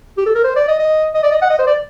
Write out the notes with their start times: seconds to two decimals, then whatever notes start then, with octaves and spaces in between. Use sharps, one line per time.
0.17 G4
0.26 A4
0.35 A#4
0.44 C5
0.56 D5
0.68 D#5
0.79 D#5
1.14 D#5
1.23 D5
1.31 D#5
1.41 F#5
1.50 D#5
1.59 C5
1.67 D5